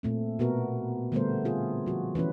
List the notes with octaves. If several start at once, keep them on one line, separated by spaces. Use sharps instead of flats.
A#2 A3 C4
B2 B3 F#4 A#4
D3 G3 A3 B3 A#4 C5
C4 F4 G#4
F3 F#4
E3 C#4 E4 B4